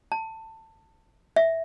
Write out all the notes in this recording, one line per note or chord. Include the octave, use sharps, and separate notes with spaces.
A5
E5